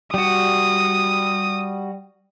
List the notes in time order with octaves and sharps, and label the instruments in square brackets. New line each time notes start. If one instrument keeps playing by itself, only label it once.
[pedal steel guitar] G3 F#4 [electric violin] D#6